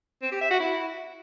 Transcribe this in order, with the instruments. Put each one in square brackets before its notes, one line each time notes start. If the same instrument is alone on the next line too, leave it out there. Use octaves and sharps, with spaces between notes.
[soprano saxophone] C4
G4
E5
F#4
E4